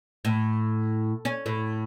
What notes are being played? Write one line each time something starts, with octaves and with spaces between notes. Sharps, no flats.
A2
C#4
A2